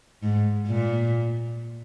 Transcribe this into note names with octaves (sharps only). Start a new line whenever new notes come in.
G#2
A#2